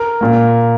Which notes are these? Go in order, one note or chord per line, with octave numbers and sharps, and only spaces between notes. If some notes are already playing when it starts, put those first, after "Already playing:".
Already playing: A#4
A#2 A#3